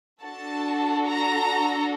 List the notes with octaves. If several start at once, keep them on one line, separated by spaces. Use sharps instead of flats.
D4 F#4 A4 A5
A#5